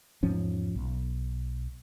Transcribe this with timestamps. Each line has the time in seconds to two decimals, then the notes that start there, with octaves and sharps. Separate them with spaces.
0.23 E2 G#2 F3 C#4
0.75 B1